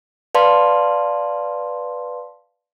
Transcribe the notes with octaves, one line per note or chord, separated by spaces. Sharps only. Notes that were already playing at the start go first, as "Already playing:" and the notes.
B4 D5 F5 A5 C6